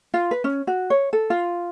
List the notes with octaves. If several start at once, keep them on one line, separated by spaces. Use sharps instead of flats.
F4
B4
C#4
F#4
C#5
A4
F4